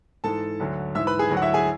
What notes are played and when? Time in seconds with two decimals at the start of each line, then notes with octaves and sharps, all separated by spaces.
0.24 G#2 E3 A4 A5
0.60 D2 D3 F#3
0.95 G#2 E3 E5 E6
1.07 B4 B5
1.19 G#4 G#5
1.30 D2 D3 F#3
1.37 F#5
1.42 E4 E5
1.54 G#4 G#5